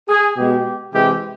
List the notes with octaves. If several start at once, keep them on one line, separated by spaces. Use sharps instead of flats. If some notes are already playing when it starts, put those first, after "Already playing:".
G#4
B2 G#3 G4
C3 E3 G#3 G4